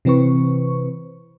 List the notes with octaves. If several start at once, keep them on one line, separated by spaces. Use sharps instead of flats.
C3 E3 C4 B4 C#6